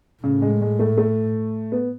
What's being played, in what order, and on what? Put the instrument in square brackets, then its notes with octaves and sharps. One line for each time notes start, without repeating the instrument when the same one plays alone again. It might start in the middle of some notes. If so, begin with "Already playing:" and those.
[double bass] A2 [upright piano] C#3
[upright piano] G#3
G#3
A3
A3
B3